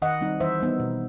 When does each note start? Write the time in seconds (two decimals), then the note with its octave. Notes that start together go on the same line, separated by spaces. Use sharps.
0.02 D#3 D#5 F#5
0.21 G3 C4 D#4
0.40 E3 C5 E5
0.60 G3 B3 D#4
0.80 B2